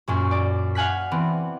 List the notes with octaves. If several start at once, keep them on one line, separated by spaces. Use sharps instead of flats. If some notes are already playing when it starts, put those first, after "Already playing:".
F#2 A#2 F#3
D5
F5 F#5 G#5 F#6 B6
E3 B3 C4